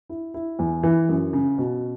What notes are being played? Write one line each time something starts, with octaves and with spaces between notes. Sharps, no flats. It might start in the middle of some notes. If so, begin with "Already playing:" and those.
E4
E4
E2
E3
F#2
C#3
B2